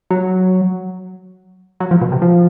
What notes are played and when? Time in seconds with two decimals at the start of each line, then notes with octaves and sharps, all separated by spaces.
0.10 F#3
1.80 F#3
1.91 F3
2.01 B2
2.12 C3
2.22 F3